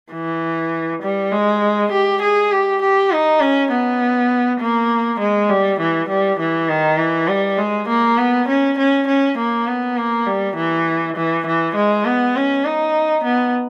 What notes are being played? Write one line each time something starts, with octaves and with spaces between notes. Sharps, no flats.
E3
G3
G#3
G4
G#4
G4
G4
D#4
C#4
B3
A#3
G#3
G3
E3
G3
E3
D#3
E3
G3
G#3
A#3
B3
C#4
C#4
C#4
A#3
B3
A#3
G3
E3
E3
E3
G#3
B3
C#4
D#4
B3